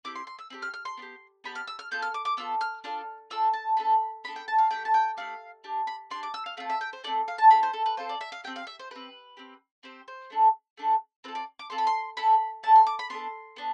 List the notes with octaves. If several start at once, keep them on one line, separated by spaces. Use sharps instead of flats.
C4 E4 G4 D6
C6
C6
E6
C4 E4 G4
F6
F6
C6
B3 D4 G4
B3 D4 G4 B5
F6
E6
F6
B3 F4 A4 G6
F6
D6
D6
B3 F4 A4 E6
F6
D4 F4 A4 F6
D4 F4 A4 E6
A5
B3 D4 A4 B5
B3 D4 A4 B5
G5
A5
F5
A3 D4 G4 G5
A5
G5
A3 D4 G4 F5
D4 G4
B5
D4 G4 C6
D6
E6
F5
A3 C4 F4 A4 F5
E5
G5
C5
A3 C4 F4 A4 D5
F5
A5
C4 F4 A4 B5
C5
A4
B4
C4 F4 A4 C5
D5
E5
F5
C4 G4 G5
F5
E5
C5
C4 G4 B4
C4 G4
C4 G4 C5
C5
A3 D4 A4
A3 D4 A4
C4 F4 A4 B4
D5
D6
C4 F4 A4 C6
B5
C6
A3 E4 A4 B5
A3 E4 A4 A5
C6
D6
B5
B3 D4 A4 C6
B3 D4